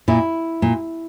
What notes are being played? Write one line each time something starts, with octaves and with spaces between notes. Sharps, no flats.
A#2 E4
A#2